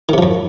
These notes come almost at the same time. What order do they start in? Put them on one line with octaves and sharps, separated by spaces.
D#3 C3 F3 F#2